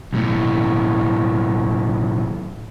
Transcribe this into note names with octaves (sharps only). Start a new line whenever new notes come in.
B1 A2